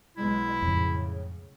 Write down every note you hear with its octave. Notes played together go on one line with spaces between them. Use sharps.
B1 B2 G#3 E4
F2 A2 C#3